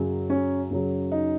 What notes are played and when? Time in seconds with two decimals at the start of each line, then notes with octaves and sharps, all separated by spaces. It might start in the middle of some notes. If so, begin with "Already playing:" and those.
Already playing: F#2 C#3 F#3
0.30 C#4
0.71 F#2 C#3 F#3
1.12 D#4